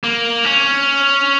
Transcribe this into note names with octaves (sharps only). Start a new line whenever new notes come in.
A#3
C#4